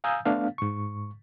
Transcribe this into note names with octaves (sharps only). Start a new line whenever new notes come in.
F5 G#5 A#5 D#6 E6 G6
A3 B3 D4 F5
G#2 C#6